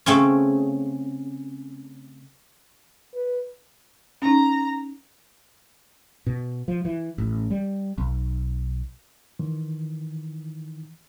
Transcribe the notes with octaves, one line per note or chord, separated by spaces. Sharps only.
C#3 A3 C4 C#4
B4
C#4 D#4 A#5
B2
F3
E3
A1
G3
B1
D#3 E3